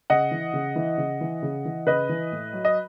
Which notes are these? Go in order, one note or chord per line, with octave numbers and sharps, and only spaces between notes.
C#3 D#5 F#5
E3
C#3
E3
C#3
E3
C#3
E3
C#3 B4 D#5
E3
A2
F#3
D#5